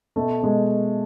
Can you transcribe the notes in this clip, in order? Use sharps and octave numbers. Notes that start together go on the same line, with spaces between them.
B2 A3
B2 G#3